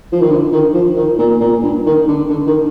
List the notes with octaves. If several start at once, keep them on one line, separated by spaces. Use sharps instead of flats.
F3
D#3
D3
D#3
F3
D#3
A#2
A#2
G2
D#3
D3
D3
D#3